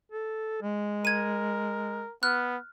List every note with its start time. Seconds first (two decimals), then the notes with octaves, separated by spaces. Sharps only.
0.12 A4
0.61 G#3
1.05 A#4 G#6 D#7
2.23 B3 F6 F#6